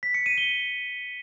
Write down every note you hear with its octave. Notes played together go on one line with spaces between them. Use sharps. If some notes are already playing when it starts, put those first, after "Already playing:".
B6
C#7
D#7
G7